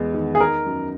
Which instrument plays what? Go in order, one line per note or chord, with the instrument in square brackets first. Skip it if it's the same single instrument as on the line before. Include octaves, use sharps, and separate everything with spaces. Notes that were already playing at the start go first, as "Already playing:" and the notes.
Already playing: [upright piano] E2 G#3 B3
D#3
[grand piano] G#4
[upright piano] D#4 [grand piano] A#4
[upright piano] F#2